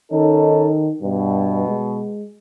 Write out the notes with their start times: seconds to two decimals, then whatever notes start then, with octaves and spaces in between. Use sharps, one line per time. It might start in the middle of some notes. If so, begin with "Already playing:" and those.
0.12 D#3 C#4 D#4 A4
1.02 G2 B2
1.68 G#3